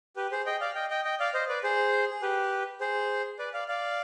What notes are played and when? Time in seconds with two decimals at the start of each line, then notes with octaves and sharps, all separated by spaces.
0.16 G4 B4
0.31 G#4 C5
0.46 D#5 G5
0.61 D5 F5
0.75 D#5 G5
0.90 D#5 G5
1.05 D#5 G5
1.19 D5 F5
1.34 C5 D#5
1.49 B4 D5
1.63 G#4 C5
2.10 G#4
2.22 G4 B4
2.81 G#4 C5
3.39 B4 D5
3.54 D5 F5
3.68 D5 F5